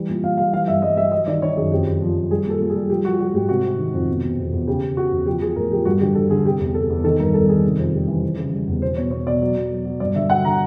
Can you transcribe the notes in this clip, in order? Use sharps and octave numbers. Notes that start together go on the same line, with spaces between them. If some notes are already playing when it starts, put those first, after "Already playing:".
Already playing: E3 G3
A#2
A#2 F5
G3 F5
E3 F5
G2 E5
G2 D#5
G3 E5
F#3 D#5
D#3 D5
D#3 C#5
F#2 G#4
F2 G4
F2
F3
F3
G3 G#4
A#2
A4
A#2
G#4
G3
F3 G4
F3 F#4
F3 F#4
G#2 G4
C3 F#4
C3
D#3
F2
B2
B2
E2
E2
C#3 G4
C#3
C#3 F#4
E2
F3 G4
F3 G#4
A2 A#4
F3 G4
G2 F#4
D3 G4
D3 A4
D3 G#4
C3 G4
E2 G#4
C3 A4
E2
D#3 A4
G2 A#4
G2 A4
D#3 G#4
C3
F2
G3
E3
E3
C#3
G3
E2
B2 C5
B2 C#5
B2 C#5
B2 D5
F#3
B2
F#3
F#3
G2 D5
D3 E5
F#3 F#5
D3 A#5